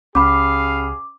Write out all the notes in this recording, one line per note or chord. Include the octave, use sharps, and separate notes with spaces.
C#2 C#4 G4 G#4 F5 B5 D6